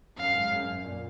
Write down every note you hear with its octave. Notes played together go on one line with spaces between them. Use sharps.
F#2 F5
G#2
F#2
F#2
A#2